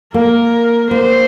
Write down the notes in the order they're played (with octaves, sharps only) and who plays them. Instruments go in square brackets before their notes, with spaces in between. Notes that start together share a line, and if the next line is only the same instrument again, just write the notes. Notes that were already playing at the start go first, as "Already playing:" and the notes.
[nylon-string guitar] A#3 [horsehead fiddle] A#4
[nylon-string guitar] A#3 [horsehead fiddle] C5